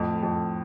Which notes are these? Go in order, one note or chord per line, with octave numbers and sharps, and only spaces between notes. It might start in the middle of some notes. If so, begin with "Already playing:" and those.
Already playing: F2 A2
F2